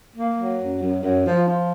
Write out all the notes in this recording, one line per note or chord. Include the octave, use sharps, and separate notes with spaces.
A#3
F#3
F#2
F#2
F#2
F3
F3